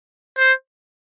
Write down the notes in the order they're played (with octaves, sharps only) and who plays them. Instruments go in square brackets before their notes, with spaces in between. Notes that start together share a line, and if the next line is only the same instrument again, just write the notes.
[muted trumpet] C5